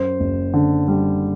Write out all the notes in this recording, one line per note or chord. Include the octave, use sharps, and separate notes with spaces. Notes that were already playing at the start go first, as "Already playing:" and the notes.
Already playing: F#2 C5
F#1
D3
G3